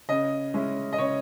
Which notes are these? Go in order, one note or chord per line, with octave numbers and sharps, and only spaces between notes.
C#3 D#5
G#3 C#4 E4
D#5
C#3 C#5